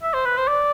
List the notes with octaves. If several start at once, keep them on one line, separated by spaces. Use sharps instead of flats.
E5
C5
B4
C5
D5